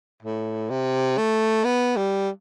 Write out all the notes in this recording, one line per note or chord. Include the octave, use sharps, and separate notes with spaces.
A2
C3
A3
B3
G3